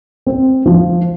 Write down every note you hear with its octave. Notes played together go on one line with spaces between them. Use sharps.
C4
F3